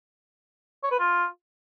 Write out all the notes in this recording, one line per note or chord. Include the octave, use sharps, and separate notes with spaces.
C#5
B4
F4